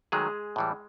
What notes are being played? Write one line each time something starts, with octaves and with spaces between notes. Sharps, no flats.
D#3 F#3 G#3 A3 G#4
A2 E3 G3